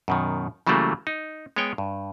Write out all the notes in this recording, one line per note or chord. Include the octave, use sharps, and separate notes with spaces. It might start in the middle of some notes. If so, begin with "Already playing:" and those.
F#2 B2 D#3
C#3 E3 F#3 G3 A3 A#3
D#4
G#3 B3 C#5 G5
G2